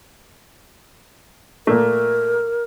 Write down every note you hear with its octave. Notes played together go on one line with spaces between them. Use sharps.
A#2 A3 A#4